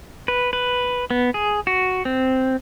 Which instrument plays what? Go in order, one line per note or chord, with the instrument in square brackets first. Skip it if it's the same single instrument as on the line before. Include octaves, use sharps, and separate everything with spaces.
[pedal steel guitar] B4
B4
B3
G#4
F#4
C4